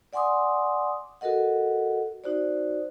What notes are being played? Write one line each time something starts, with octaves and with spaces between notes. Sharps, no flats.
D5 F#5 G#5 C6 D6 D#6
F#4 A4 A#4 D#5 F#5
D#4 F#4 C5 D5